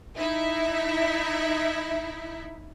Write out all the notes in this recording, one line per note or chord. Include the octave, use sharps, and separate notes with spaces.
D#4 E4 E5